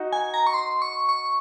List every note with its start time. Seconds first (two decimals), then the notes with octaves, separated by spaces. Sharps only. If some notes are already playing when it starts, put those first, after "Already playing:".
Already playing: D#4 F#4
0.13 G#5
0.34 A#5
0.47 C#6
0.54 C6
0.82 C#6
1.09 C#6